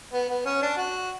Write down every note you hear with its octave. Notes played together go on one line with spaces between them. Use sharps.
B3
B3
C#4
D4
F#4